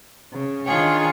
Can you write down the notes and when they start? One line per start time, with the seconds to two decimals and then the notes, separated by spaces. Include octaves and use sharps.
0.32 C#3
0.66 D#3 D4 F4 G#4 C#5